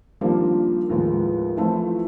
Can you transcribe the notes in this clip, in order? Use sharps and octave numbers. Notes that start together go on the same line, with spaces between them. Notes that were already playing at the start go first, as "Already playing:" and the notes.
D#3 F3 G3 A#3 C4 D4
D#2 A2 F3 G#3 B3
E3 F3 A3 C4 E4